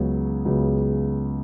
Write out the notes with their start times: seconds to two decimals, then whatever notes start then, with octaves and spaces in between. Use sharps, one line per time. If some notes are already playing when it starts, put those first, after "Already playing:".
Already playing: C#2 C#3 F#3 B3 G#4
0.45 C#2 C#3 F#3 B3